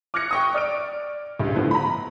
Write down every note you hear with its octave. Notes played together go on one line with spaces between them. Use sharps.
D6 F6 F#6 G#6 A#6 C#7
G5 C#6 D#6
D5 F6 D7
C#2 G2
A2 D3 F3 B3 E4
A#5 B5